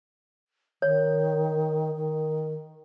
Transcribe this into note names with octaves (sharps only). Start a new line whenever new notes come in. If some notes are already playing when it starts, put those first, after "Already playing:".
D#3 C#5
D#3